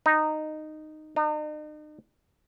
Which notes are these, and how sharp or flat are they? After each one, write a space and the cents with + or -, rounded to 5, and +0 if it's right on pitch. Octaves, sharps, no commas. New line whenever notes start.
D#4 -10
D#4 -40